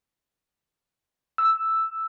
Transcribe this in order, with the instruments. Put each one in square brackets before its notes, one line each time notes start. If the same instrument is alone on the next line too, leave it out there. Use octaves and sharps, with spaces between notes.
[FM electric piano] E6